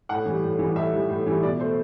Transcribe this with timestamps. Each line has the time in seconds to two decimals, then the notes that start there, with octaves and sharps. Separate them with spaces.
0.09 A2 F#5
0.26 E3 G3
0.43 A2
0.59 E3 G3
0.76 A2 E5
0.93 E3 G3
1.09 A2
1.27 E3 G3
1.43 B2 D5
1.59 A3 C5